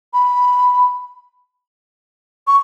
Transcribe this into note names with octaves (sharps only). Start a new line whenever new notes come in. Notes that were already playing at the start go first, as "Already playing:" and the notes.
B5
C#6